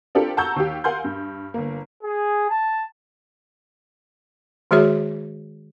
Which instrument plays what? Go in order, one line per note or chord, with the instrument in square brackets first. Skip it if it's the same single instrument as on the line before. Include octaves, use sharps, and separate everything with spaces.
[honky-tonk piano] C4 D4 F4 G4 A4 A#4
F#5 A5 A#5 C#6 E6 G6
D#2 G4
A#4 F5 F#5 G#5 C6 G6
G2
G1 A#3
[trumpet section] G#4
A5
[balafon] D#3 G#3 F#4 G#4 C#5 E5